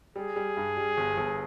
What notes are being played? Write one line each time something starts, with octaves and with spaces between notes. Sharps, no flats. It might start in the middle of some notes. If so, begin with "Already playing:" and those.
G3 G#4
G3
G2
G3
G1
G1